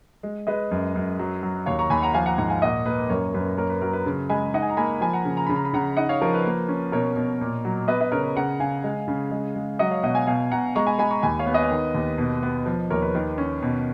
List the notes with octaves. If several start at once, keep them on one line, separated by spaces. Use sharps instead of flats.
G#3
G#3 B4 D#5
F#2
F#2
F#3
F#3
D#2 C#5 F5
A#5 C#6
D#2 G#5 B5
F#5 A#5
F3 F5 G#5
F#5 A#5
G#2 F#5 A#5
F5 G#5
A#2 D#5 F#5
A#3 B4
F#2 A#4 C#5
F#2 B4
A#3 A#4 C#5
B4
F#3 A#4
B4
C#3
G#3 G#5 B5
D#4 D#5 F#5
G#5
A#5
A#3 G#5 B5
F3 G#5 B5
F#5 A#5
C#3
A#5
C#3 B5
A#5
B5
C#3 F#5 A#5
D#4 D#5 F#5
C#5 F5
F3 A#4 C#5
B4
A#3
C#4
B2 A#4 C#5
B2
A#2
F#3
B3 B4 D#5
B4 D#5
C#3 A#4 C#5
B4
C#3 F#5 A#5
C#3 F5 G#5
G#3
C#3
G#3
G#3
F#3 D#5 F#5
C#5 F5
B2 D#5 F#5
F5 G#5
B2 F5 G#5
B2 F#5 A#5
G#3 A#5 C#6
G#5 B5
G#3 G#5 B5
A#5 C#6
D#2 G#5 B5
C#5 F5
B3
B4 D#5
D#3
D#2
B2
B3
F3
D#2 A#4 C#5
B4
D#3
C#4
B2